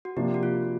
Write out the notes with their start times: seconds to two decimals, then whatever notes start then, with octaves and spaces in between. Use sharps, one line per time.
0.05 F#4
0.16 C3 F3 A#3 D4 G4
0.34 F#4
0.43 F4